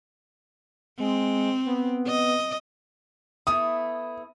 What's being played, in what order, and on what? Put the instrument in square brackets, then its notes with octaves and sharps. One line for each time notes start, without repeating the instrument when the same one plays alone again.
[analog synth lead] G#3 [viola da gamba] C4
[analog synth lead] B3
[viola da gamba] D#5
[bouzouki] A3 B3 E4 [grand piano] D#6